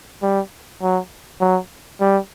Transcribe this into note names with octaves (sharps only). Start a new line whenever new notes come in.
G3
F#3
F#3
G3